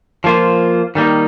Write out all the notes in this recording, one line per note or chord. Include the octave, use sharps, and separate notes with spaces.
F3 A#3 F4 C5
D#3 G3 A#3 D#4